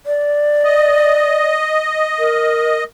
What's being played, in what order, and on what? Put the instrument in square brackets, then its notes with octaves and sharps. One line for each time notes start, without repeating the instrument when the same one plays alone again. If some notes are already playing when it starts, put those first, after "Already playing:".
[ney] D5
[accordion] D#5
[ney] A#4